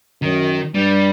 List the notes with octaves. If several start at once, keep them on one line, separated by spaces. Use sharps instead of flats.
F#2 D#3
G2 G3